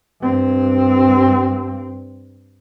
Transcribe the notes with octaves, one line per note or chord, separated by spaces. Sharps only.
G2 C4